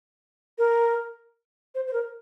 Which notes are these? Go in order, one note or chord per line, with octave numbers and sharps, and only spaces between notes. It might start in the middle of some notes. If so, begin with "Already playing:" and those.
A#4
C5
C5
A#4